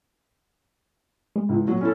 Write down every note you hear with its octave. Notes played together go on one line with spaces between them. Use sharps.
G#3
C#2 E3
A#2 F#3
C#4 E4 A4